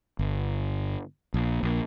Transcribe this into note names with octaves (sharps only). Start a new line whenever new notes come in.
G1
A#1
A#1